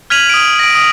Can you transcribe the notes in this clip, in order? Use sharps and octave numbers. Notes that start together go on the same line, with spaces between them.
F6 G#6 B6 D#7 F7 F#7
D#6 D7
A#6 D7
D#6